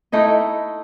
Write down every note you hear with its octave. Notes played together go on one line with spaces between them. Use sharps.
A3 D#4 E4 D#5